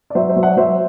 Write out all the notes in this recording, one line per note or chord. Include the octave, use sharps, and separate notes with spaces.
D5
F#3 C5 E5
C5 E5
F#3
D5 F#5
F#3 C5 E5